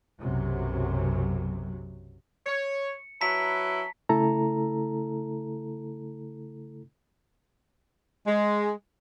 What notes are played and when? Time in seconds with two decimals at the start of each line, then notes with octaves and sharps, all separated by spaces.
0.23 B1 F#2 C3 F#3
2.46 C#5 C#7
3.21 F#3 E4 B4 A5 A#5 B6
4.09 C#3 A3 E4 A4 A#5
8.26 G#3